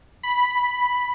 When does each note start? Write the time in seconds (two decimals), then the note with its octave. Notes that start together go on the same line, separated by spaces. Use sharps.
0.23 B5